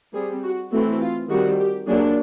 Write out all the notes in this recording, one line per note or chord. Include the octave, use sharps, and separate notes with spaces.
G3 C4 G#4
F#4
E3 A3 C4 F#4
F4
D#3 G3 C4 F#4
G4
F#3 A#3 D4 G#4